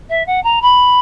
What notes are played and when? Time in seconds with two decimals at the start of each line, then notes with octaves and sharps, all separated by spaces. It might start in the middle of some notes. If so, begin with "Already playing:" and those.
0.09 E5
0.26 F#5
0.43 A#5
0.62 B5